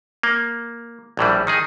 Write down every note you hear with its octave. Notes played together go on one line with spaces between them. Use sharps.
A#3
A#1 A2 E3 G3
D#3 D#4 G#4